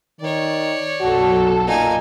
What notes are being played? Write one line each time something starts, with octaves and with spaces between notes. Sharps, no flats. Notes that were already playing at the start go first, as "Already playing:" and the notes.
D#3 C#5 D5
B1 F#2 F#4 A4
A#2 D#4 G#5